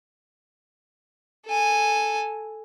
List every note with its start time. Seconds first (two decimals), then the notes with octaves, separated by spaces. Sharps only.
1.46 A4 G#5